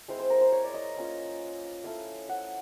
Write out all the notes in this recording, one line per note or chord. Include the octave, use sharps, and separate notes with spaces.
G#3 C4 E4 C5
C5
A#4
C5
C#5
D5
D#5
A#3 C#4 F4
A3 C#4 E4 F5
F#5